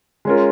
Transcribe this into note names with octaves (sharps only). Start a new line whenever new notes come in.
G#3 C#4 F4 A#4